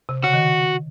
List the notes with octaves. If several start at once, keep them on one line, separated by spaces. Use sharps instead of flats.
C3
C#3 F#4
D#3